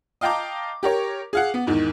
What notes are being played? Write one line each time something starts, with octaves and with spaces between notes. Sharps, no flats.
D#5 F5 G5 A5 A#5 D6
G4 A#4 C#5
G#4 F5 F#5
B3
E2 G#2 D#3